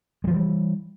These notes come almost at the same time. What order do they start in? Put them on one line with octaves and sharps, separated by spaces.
G#3 F3 E3 G3